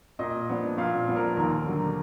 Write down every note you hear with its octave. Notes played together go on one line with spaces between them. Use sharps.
A#2 D#5
F3 B3 D4
A#2 F5
F3 B3 D4
A#4
D#2 A#4
D3 F#3